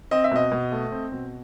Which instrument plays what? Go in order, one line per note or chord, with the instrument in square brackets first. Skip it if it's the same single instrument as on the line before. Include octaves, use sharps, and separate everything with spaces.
[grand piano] C4 D#5
E5
B2 D#5
B2
A3
C4
B2